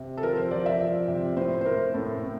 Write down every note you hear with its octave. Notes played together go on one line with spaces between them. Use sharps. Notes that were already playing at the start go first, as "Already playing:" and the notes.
Already playing: C3
A4
F3 A#4
C5
F3 D5
E5
F3
C3
A2 C5
C5
A2 A#4
A2 A4
A2